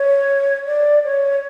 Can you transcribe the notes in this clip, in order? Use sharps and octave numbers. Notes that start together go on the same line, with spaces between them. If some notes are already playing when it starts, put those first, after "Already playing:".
Already playing: C#5
D5
C#5